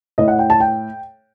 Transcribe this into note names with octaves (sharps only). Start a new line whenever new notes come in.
A2 D#5
F#5
G5
A5
G5